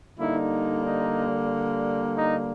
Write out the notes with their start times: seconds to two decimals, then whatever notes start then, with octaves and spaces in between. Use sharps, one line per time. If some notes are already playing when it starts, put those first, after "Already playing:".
0.18 D3 G3 A#3 D#4 E4
0.85 D#4
2.16 D#4